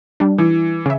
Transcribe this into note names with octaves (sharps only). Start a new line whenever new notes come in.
G3 D4
E3
C#3 E5